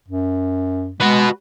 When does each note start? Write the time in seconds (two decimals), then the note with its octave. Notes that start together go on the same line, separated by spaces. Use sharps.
0.08 F#2
1.00 G#3 F#4 B4